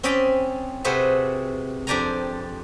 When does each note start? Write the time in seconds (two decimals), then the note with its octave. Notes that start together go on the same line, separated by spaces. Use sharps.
0.03 C4 C#4 D5 D#5 G5 B5
0.84 C3 F#4 G#4 A4 B4 C5
1.87 F2 D4 G4 D5 G#5 A#5